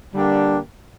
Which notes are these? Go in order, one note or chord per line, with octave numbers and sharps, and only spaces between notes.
D3 G3 A#3 D4 G4